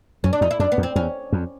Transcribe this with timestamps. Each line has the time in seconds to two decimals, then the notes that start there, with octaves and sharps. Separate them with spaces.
0.24 F#2 C#4
0.33 D4
0.41 F2 D#4
0.51 E4
0.59 F#2 D4
0.72 B3
0.78 F2
0.83 C4
0.95 E2 C#4
1.32 F2